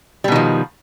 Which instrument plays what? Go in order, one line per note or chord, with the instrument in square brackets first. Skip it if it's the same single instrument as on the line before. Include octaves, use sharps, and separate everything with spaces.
[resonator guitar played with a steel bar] G3
B2
D#3
F3